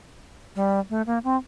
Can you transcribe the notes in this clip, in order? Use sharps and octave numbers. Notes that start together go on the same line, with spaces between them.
G3
A3
A#3
C4